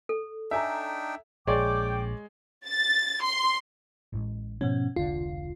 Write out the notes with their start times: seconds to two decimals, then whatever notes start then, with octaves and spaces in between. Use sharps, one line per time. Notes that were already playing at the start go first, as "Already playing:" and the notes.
0.09 A4
0.51 D4 D#4 E5 G5 G#5 A#5
1.47 A#1 G#3 C#5 D5 G5 D6
2.68 A6
3.23 C6
4.13 A1 A2 G#3
4.61 G#2 B2 F3 B3 C#4
4.96 E1 C2 D3 F4